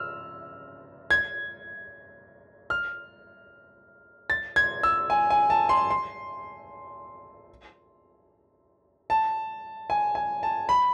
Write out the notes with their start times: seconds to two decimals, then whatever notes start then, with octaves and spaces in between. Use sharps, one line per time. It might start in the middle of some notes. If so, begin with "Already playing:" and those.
Already playing: E6 F6
1.11 G#6
2.70 F6
4.30 A6
4.56 G#6
4.83 E6
5.10 G#5
5.30 G#5
5.50 A5
5.69 C6
5.90 C6
9.10 A5
9.90 G#5
10.15 G#5
10.43 A5
10.69 B5